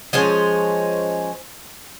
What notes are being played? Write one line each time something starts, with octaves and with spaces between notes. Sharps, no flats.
F3 G#3 C#4 C5